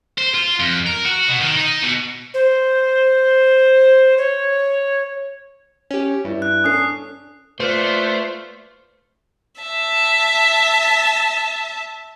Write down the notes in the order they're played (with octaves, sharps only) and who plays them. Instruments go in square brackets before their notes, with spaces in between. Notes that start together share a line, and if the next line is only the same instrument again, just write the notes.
[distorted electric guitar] C5
F4
F2
A#4
F#4
B2
D#3
D#4
B2
[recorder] C5
C#5
[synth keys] C#4 G4
[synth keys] G2 [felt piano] E4
[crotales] F#6
[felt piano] C#4 D4 A4 [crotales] D#6 C7
[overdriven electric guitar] A3 [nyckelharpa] F4 D5 [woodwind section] B4 [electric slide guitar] C5
[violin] E5 A5